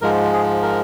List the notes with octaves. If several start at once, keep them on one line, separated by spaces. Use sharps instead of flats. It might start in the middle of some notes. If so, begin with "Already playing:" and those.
G#2 F3 G#3 A#4
G#4
A#4